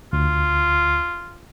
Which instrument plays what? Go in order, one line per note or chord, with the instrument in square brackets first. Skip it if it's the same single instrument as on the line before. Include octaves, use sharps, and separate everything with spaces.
[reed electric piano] D2 [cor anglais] F4